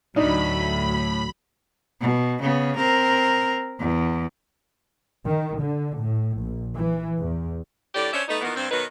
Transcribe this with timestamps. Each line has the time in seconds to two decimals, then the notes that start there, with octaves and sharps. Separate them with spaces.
0.16 D2 A2 F#3 D4 D#4 B5
2.01 B2
2.42 C#3 B3
2.77 C4 A#4
3.80 E2
5.27 D#3
5.62 D3
5.99 A2
6.40 A#1
6.77 E3
7.18 E2
7.94 A2 D3 G4 D5
8.12 C#4 D4 C5 C#5 E5
8.28 A3 B3 D#4
8.41 A#2 D#3 E3 B3
8.56 G2 C4
8.71 B2 D#3 F#3 D#4 B4